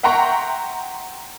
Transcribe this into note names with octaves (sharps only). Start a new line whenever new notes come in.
E5 F#5 G5 A#5 C6 C#6